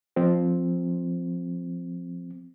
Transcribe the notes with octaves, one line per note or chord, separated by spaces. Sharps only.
F3 C4